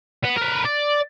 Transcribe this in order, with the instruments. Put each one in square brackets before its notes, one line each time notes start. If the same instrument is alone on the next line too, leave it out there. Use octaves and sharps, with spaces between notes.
[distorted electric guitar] B3
A#4 B4
D5